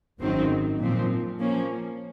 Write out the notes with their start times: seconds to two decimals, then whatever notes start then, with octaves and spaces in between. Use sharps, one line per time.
0.20 G#1 F#2 D#3 F#3 C4
0.80 A#2 F3 C4
1.39 F3 A#3 C#4